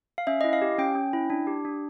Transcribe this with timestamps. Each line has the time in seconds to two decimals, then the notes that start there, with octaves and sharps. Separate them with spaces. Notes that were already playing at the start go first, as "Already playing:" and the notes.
0.18 F5
0.27 C#4 E5
0.41 E4 D#5
0.53 F5
0.62 G4
0.78 C#4 G5
0.95 C#4
1.13 E4
1.30 D4
1.47 G4
1.65 D4